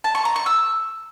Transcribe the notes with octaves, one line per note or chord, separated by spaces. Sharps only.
A5
C#6
A#5
C#6
E6